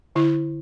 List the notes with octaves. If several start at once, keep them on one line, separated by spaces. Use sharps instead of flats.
D3 E4